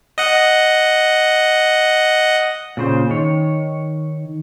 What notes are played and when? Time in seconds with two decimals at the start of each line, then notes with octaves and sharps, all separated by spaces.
0.18 D#5 F#5
2.77 A#2 C#3 C5
3.10 D#3 C#5